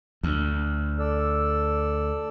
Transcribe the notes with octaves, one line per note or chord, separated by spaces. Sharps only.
D2
A4 D5 E6